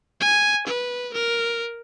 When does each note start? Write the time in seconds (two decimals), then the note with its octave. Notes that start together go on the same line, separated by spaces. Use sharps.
0.21 G#5
0.67 B4
1.14 A#4